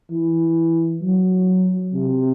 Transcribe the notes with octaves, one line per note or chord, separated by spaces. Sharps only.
E3
F#3
C3